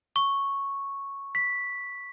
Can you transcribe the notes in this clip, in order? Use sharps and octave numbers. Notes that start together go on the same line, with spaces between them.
C#6
B6